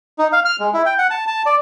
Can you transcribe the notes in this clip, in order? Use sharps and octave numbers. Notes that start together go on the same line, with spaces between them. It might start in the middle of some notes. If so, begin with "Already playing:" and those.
D#4
F5
F6
G#3
E4
G5
F#5
A5
A5
D5